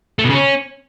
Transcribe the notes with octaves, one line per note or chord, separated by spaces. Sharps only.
A3
B2
C#3
C#4